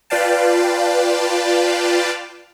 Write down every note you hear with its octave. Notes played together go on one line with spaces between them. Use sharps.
F4 B4 D5 F5 G5 A5